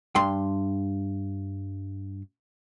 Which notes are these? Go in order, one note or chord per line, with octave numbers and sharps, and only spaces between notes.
G2 C6